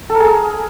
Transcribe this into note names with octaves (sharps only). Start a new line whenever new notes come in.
A4
A#4
G#4